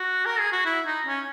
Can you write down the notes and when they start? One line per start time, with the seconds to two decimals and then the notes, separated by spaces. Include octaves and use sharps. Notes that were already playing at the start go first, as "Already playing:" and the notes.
Already playing: F#4
0.26 A#4
0.39 G#4
0.52 F#4
0.66 E4
0.86 D#4
1.07 C#4